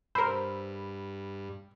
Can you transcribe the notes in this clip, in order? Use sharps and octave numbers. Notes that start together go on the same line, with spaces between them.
G2 A#4 C5 B5 E6